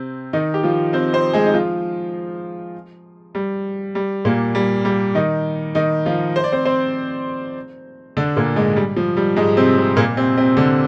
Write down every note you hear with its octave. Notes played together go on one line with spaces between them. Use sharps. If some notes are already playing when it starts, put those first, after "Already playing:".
Already playing: C3 C4
D#3 D#4
G4
F3 F4
C4 C5
C4 C5
G#3 G#4
D#4
F3 F4
G3
G3
A#2 A#3
G3
G3
D#3 D#4
D#3 D#4
F3 F4
C5
D5
C4 C5
C4 C5
D3 D4
A#2 A#3
G#2 G#3
G3
F3
G3
G#2 G#3
C3 C4
C3 C4
A#2 A#3
C3 C4
C3 C4
D3 D4